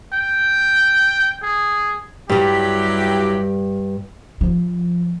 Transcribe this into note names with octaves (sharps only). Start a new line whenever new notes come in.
G5
G#4
G2 F#3 G3 E4 G4
F3